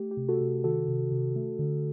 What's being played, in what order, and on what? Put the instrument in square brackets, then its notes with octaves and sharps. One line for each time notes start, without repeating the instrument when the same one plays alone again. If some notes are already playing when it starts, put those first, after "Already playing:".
Already playing: [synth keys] A3 G4
G4
C3
F#4 A4
C3
D#3 F#4 A4
C3
C3
A3
D3